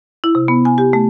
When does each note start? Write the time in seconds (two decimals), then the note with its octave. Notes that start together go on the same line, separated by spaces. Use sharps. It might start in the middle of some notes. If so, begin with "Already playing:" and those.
0.24 E4
0.35 C3
0.48 B3
0.65 G#5
0.78 G4
0.93 A3